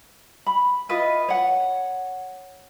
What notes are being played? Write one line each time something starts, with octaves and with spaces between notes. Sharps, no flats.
B5
E4 F4 B4 D#5
C#5 F#5